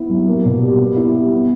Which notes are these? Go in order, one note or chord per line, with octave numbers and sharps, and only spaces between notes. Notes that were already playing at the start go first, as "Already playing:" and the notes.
Already playing: B3 E4
F#3
A#3
B2
G3
B3
E4
G3
B3